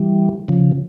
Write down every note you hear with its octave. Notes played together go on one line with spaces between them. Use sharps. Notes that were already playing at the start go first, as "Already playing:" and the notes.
Already playing: E3 G3
C#3 F3